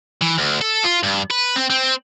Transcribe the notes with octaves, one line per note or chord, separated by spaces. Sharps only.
E3
D2
A4
F4
G2
B4
C4
C4